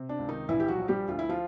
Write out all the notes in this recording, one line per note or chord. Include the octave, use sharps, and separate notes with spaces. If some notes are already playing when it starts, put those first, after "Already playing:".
Already playing: C3
D4
C#2
D#3 D#4
A#1 E3 E4
G4
F#3 F#4
F3
G3 G4
D2 F4
E4
F3 F4